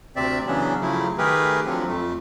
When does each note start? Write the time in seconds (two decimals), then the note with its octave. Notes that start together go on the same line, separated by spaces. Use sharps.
0.16 D2 C3 C4 D5 E5
0.47 C#3 E3 F#3 B3 C#4 D4
0.81 C#3 F3 F#3 A3 E4
1.18 D#3 A3 G4 G#4 A#4 B4
1.66 D3 F3 F#3 C4
1.87 F2 A3